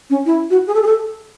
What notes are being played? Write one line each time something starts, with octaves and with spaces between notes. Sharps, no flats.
C#4
E4
F#4
G#4
A4
G#4
A4